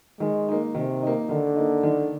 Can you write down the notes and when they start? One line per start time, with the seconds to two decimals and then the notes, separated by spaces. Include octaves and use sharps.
0.20 D#3 G#3
0.48 A#3 D#4
0.75 C3 D#3
1.02 A#3 D#4
1.29 D3 D#3
1.56 A#3 D#4
1.83 D#3